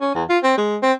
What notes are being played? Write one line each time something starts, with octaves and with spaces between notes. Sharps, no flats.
C#4
E2
F4
C4
G#3
C4